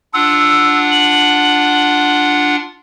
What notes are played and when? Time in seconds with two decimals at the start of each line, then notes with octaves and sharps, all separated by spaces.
0.14 D4 F4 F#5 E6
0.91 F#7